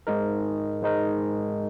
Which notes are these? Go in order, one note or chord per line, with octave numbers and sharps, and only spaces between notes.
G#2 G#3 D#4 A#4
G#2 G#3 D#4 A#4